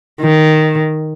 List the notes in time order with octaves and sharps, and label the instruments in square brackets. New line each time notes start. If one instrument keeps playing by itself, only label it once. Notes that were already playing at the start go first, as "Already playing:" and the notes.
[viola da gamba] D#3